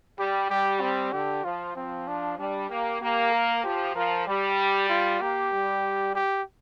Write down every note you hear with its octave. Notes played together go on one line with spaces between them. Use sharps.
G3 G4
G3 G4
C4
D3 G4
F3 F4
F3 C4
D4
G3 D4
A#3 G4
A#3 G4
A#4
F3 G4
F3 A#4
G3 G4
F4
A#3 G4
G3
G4